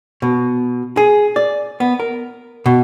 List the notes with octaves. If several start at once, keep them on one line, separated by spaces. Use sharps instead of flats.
B2
G#4
D5
B3
A#4
B2